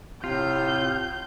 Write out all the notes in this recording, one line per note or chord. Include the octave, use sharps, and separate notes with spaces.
A2 C3 F4 G6